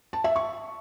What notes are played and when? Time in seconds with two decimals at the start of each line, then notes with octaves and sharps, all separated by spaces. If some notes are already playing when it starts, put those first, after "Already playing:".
0.13 A5
0.24 E5
0.36 C#6